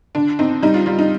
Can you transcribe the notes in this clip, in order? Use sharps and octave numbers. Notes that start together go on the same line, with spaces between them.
D3 D4
C4 D#4
G3 D#4
F4
G3 F4
D#4